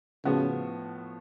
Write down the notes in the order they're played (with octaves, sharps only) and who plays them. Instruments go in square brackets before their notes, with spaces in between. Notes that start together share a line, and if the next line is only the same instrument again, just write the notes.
[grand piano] A2 F3 B3 F#4 [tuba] C#3